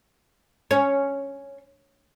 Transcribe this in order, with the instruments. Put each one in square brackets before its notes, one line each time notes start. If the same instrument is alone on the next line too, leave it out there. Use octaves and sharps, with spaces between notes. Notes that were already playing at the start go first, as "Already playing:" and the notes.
[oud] C#4 [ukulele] C#5